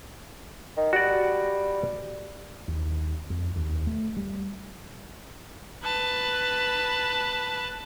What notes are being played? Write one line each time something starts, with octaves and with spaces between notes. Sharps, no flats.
D#3
G3 F#4 D5
D#2
F2
D#2
A3
G3
B4 A5